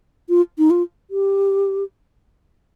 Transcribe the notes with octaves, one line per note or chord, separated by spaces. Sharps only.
F4
D#4
F4
G4